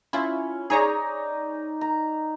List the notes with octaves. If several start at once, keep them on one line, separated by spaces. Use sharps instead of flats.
C#4 E4 F4
D#4 G#4 C#5 D5 A#5
A#5